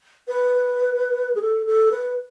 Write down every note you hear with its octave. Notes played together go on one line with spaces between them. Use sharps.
B4
G#4
A4
A4
B4